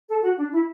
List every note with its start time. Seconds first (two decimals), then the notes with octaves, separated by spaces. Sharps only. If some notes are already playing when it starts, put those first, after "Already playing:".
0.09 A4
0.23 F#4
0.37 D4
0.52 E4